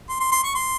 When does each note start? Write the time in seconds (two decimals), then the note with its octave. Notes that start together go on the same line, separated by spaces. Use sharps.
0.09 C6
0.20 C6
0.32 C6
0.44 C#6
0.55 C6